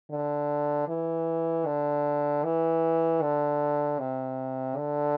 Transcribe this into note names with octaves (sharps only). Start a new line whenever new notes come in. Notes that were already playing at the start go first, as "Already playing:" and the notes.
D3
E3
D3
E3
D3
C3
D3